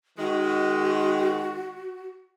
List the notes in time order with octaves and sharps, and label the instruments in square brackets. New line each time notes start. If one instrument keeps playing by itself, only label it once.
[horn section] D#3 G#3 [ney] F#4